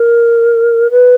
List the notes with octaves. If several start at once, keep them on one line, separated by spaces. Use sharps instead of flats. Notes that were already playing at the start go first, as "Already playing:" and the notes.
Already playing: A#4
B4